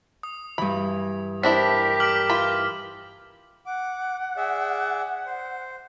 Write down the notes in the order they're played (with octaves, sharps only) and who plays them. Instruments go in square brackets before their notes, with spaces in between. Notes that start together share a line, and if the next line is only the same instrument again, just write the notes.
[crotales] D#6
[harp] G2 E3 [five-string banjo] B5
[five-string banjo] C4 D4 E4 [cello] G4 A#4 [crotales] B6
[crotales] D6 F6 F#7
[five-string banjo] E3 F4 B5
[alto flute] F#5 [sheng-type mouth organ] D6
[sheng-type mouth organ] G#4 D5 E5
C5